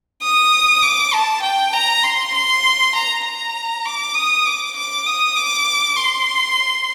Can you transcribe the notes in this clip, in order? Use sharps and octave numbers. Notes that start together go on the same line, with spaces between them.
D#6
D6
A5
G5
A#5
C6
C6
A#5
A#5
D6
D#6
D6
D6
D#6
D6
C6